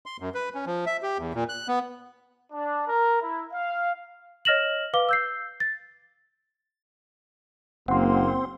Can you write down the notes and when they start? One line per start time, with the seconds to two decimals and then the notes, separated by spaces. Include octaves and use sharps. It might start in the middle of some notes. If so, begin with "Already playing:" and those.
0.06 C6
0.20 F#2
0.34 B4
0.55 C#4
0.66 F3
0.86 E5
1.03 G4
1.18 E2
1.34 A#2
1.49 F#6
1.68 B3
2.53 D4
2.88 A#4
3.22 E4
3.53 F5
4.45 C#5 D#5 F6 A#6 E7 F#7
4.94 B4 F5 D6 G7
5.09 E6 G6 C7
5.60 A6
7.88 F#1 A#3 C4 F#5 C6